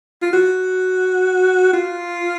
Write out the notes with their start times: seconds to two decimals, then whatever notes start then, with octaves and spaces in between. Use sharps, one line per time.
0.22 F4
0.33 F#4
1.73 F4